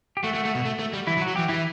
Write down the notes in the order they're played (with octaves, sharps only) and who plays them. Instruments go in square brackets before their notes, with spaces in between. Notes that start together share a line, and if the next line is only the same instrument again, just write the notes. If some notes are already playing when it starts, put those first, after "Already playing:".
[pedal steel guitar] G4
[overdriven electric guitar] A3 [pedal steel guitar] F#4
[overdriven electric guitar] A3
A3
B2
A3
A3
G3
[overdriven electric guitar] E3 [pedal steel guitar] E4
[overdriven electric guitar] F#3
[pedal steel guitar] F#4
[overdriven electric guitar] F#3
[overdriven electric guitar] E3 [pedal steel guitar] G4
[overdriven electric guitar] E3 [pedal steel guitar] E4